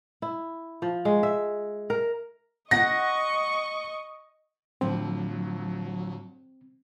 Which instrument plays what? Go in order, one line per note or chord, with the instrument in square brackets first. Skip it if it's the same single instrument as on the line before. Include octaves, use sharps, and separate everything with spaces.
[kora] E4
F3
G#3
E5
A#4
[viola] D#5 C#6 [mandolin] F#5 [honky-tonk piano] A#6
[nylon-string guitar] A2 D3 F3 [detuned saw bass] F#3 [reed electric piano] C4